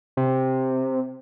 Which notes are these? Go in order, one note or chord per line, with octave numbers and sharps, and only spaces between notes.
C3